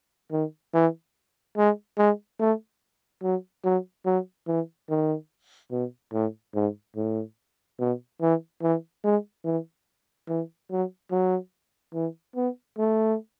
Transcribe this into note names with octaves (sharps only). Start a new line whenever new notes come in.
D#3
E3
G#3
G#3
A3
F#3
F#3
F#3
E3
D#3
B2
A2
G#2
A2
B2
E3
E3
G#3
E3
E3
F#3
F#3
E3
B3
A3